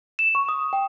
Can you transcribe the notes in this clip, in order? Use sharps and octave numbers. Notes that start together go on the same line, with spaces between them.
E7
C#6
D#6
G5